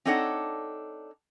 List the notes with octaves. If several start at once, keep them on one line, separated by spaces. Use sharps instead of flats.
C4 D4 D#4 A4 C#5 F#5